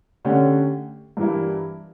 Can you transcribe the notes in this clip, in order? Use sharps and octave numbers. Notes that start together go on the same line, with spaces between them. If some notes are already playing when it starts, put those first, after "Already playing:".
D3 A3 C#4 G4
G2 E3 G3 A#3 E4